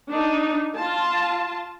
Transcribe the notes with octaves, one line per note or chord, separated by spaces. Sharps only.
D4 D#4
F4 A5